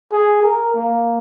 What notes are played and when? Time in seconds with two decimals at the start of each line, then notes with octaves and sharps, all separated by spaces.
0.12 G#4
0.43 A#4
0.74 A#3